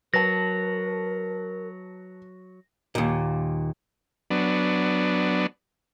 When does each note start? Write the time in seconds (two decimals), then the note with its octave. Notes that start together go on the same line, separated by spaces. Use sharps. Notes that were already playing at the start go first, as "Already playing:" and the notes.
0.14 F#3 A#4 B4 A5 A#6
2.95 D#2 A#2
4.31 F#3 B3 D4